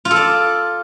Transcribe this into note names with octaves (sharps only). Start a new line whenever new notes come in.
F4
A4
D5